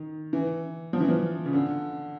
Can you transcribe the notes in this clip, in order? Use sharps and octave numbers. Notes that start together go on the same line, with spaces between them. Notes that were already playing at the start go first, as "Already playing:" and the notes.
Already playing: D#3
E3
F3
E3
F3
C#3
D3